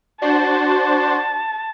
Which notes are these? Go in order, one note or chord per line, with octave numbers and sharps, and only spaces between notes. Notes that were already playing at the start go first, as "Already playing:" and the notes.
D4 F#4 C5 A5